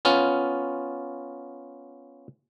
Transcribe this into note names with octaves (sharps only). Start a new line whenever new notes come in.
B3 C#4 F4